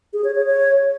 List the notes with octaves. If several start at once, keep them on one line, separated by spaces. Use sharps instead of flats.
G#4
C#5
C#5
C#5